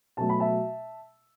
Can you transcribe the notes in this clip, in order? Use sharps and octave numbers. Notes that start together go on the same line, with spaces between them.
B2 F#3 A3 A5
B5
E5 A5